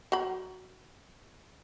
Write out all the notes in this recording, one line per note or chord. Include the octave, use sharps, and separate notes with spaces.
F#3 B5